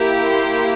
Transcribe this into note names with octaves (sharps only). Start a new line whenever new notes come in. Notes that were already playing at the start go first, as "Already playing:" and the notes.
Already playing: A#3 E4 G4
C6